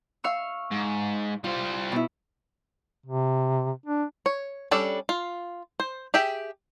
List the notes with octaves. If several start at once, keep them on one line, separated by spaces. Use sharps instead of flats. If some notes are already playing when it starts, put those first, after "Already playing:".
F5 C#6 E6
G#2
G3 F4 C5
B2 E4
C3
D4
C#5
G3 C#4 D4 A4 D5
F4
C5
G4 G#4 E5 G5